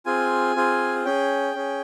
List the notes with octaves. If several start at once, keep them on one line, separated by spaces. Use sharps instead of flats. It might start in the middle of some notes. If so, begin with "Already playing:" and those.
C4 F4 G#4 G#5
C4 F4 G#4
C#4 G#4 G5
C#4 G#4